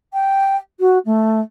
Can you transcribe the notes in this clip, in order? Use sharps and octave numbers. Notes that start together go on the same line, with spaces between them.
G5
F#4
A3